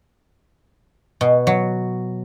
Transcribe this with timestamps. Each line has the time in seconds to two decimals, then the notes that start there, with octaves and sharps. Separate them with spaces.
1.21 B2
1.47 F#3